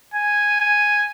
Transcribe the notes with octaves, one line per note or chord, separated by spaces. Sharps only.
G#5
G#5